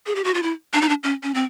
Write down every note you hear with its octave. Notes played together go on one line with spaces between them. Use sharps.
G#4
G4
F#4
F4
E4
D4
D#4
D4
C#4
C#4
C4